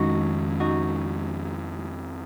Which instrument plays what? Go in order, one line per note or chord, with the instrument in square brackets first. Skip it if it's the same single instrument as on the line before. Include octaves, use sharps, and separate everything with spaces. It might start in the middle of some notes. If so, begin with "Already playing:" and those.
Already playing: [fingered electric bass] F2 D#3 G#3 C#4 [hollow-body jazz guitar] D#4 F#4
[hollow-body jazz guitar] D#4 F#4